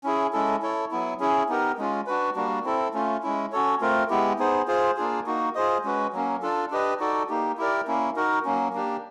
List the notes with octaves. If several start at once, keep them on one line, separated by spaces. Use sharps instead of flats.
C#4 E4 G#4
G#3 C#4 E4 A4
E4 A4 C#5
F#3 B3 E4
C#4 E4 G#4
B3 D#4 G4 A#4
G#3 C#4 F4
D4 F#4 B4
G3 A#3 D4 F#4
C4 E4 A4
A3 C#4 F4
G#3 C#4 E4
C#4 F#4 A4 C#5
A3 C4 F4 A#4
G#3 B3 E4 G4
B3 D#4 G#4 C5
F4 G#4 C5
A#3 D4 F4 G#4
A#3 D#4 F#4
F4 G#4 C5 D#5
G#3 C#4 F#4 B4
F#3 A#3 C#4
D4 F4 A4
D4 G4 B4 D#5
D#4 F#4 A4 D5
A#3 D#4 G4
E4 G4 A#4 D5
A#3 C#4 E4
D#4 F#4 A#4
F#3 A#3 C#4
A#3 D4 G4